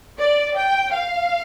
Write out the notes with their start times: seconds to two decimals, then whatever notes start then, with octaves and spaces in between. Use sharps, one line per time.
0.19 D5
0.56 G5
0.93 F5